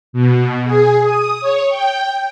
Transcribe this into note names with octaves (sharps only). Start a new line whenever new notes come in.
B2
G#4
D#6
C#5
G5